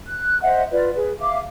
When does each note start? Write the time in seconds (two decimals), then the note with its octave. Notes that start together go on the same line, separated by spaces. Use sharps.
0.07 F#6
0.42 C5 D#5 E5 F#5
0.71 F4 B4 D5
0.95 G#4 B4
1.19 E5 F5 D6